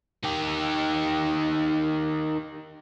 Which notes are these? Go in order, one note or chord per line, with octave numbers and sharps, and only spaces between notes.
D#3 G4